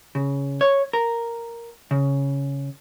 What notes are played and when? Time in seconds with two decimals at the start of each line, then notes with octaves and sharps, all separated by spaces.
0.15 C#3
0.61 C#5
0.93 A#4
1.91 C#3